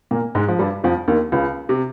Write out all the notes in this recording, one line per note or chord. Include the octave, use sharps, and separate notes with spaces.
A#2 A#3
G#2 G#3
F3
G2 G3
F2 F3
D#2 D#3
C#2 C#3
C3